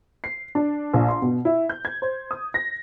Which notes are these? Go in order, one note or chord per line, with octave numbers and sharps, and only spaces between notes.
C7
D4
A#1
C6
B2
E4
G6
G#6
C5
D#6
A#6